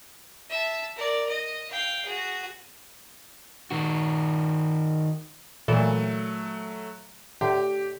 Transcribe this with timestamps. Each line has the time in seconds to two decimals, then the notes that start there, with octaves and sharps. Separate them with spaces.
0.49 E5 A5
0.96 A#4 D5
1.29 D#5
1.71 F5 G5
2.05 F#4 G#4
3.71 D#3 F#4
5.68 A#2 E3 F#3 A3 A4
7.41 A2 D3 G4